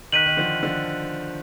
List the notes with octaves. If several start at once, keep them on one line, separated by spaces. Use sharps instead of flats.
D#3 F#6 B6 D#7 F#7
D#3
D3 F3
D3 F3